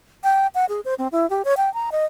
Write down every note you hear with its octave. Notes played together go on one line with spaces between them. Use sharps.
G5
F#5
G#4
C5
C4
E4
G4
C#5
G5
A#5
D#5